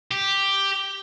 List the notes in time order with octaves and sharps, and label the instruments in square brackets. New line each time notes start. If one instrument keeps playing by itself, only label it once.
[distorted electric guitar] G4